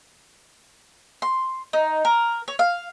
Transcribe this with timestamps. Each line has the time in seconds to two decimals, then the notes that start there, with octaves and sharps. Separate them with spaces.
1.22 C6
1.73 D#4
2.05 A#4
2.48 C#5
2.59 F5